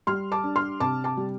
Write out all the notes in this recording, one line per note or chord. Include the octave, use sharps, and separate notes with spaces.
G3 C6 F6
A5 D6
D4
C6 F6
C3 A5 D6
A5 D6
G3